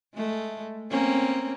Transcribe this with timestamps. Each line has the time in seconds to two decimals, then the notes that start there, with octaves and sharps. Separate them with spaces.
0.15 G#3 A3
0.90 A#3 C4 C#4